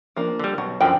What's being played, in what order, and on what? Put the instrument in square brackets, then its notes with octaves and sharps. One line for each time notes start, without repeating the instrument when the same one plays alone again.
[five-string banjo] F3 A#3 D4
[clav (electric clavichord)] D3 G3
[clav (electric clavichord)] B1 [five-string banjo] F#4
[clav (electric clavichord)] F#2 D3 F3 [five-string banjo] G5 B5